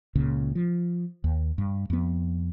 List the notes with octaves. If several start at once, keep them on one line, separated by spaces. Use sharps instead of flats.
C#2 A#2 C#3
F3
D#2
G2
F2 B3